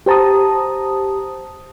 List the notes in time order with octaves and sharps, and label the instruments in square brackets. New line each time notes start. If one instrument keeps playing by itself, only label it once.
[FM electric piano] G4 C5 A5 A#5 D#6